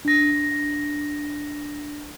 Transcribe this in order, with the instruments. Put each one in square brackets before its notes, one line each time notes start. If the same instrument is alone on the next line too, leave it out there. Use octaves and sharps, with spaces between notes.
[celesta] D4 A#6